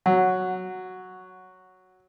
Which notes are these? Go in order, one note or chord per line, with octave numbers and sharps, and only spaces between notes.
F#3 F#5